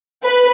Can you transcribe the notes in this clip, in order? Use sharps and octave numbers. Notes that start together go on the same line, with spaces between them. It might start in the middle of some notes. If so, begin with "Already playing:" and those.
B4